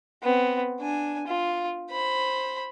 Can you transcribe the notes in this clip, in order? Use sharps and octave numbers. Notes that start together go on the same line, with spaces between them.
B3 C4
D4 G#5
F4
C5 B5